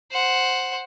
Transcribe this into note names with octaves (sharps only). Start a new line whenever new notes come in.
C5 F#5